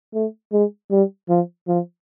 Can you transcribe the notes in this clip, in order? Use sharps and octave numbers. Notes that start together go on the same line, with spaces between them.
A3
G#3
G3
F3
F3